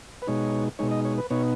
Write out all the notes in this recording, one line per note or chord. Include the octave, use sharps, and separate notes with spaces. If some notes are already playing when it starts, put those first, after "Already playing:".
B4
B2 G#3 D#4 C#5
B2 G#3 D#4 C#5
D#5
C#5
B4
B2 B3 D#4 C#5